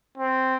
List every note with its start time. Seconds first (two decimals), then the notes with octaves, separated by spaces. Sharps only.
0.17 C4